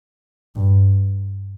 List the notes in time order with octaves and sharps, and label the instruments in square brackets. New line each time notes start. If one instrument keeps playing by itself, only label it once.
[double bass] G2